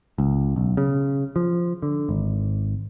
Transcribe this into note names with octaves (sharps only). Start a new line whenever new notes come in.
C#2
B1
C#3
F3
D3
G#1